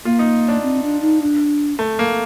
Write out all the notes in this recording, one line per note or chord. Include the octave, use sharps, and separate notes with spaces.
A#3 F4
D#4
D4
C4
D4
D#4
D4
A3
A#3